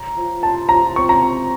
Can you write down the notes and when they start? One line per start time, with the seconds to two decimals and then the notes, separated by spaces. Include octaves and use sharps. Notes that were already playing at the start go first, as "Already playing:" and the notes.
Already playing: C#5 A#5
0.17 F3
0.43 C5 A5
0.69 F3 A#5
0.96 C4 C#6
1.09 A#5
1.22 C4